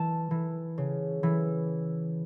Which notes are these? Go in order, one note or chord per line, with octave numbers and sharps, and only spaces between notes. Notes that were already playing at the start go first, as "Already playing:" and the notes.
Already playing: E3 A5
E3
C#3
E3